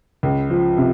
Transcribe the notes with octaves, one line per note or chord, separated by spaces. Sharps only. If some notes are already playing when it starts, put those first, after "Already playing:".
C#2
F3
C3